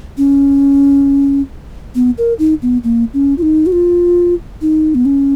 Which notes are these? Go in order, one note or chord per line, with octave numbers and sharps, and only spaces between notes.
C#4
B3
A#4
D#4
B3
A#3
C#4
F4
D#4
F#4
F4
D#4
B3
C#4